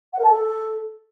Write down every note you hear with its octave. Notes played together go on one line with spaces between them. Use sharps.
F#5
A#4
A5
A4